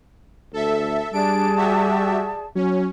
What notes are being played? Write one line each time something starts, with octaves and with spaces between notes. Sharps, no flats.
D2 A4 E5
G3 D4 G#4 D5 A5 D7
F#4 G4 E5
F#3 C#4